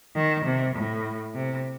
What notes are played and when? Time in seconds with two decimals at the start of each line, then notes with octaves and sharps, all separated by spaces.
0.16 D#3
0.45 C3
0.76 A2
1.34 C3